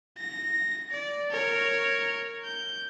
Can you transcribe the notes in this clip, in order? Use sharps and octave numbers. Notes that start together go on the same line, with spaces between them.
A#6
D5
A#4 C#5
G6